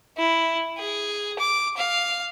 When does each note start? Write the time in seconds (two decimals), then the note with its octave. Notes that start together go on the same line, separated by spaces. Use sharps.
0.18 E4
0.78 G#4
1.39 D6
1.77 F5